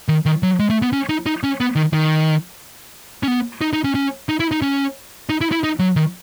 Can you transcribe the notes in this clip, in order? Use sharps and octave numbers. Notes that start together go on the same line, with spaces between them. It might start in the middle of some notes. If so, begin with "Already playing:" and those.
D#3
D#3
F#3
G#3
A3
B3
C#4
D#4
D#4
C#4
B3
D#3
D#3
C#4
B3
D#4
D#4
C#4
C#4
D#4
E4
D#4
C#4
D#4
E4
E4
D#4
F#3
D#3